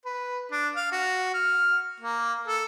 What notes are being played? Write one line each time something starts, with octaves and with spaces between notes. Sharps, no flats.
B4
D4
F5
F#4
F6
A#3
A4